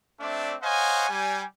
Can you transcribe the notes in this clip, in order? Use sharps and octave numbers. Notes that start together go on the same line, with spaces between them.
A3 C4 D4 D5 E5
C5 C#5 D#5 F5 F#5 G#5
G3 G#5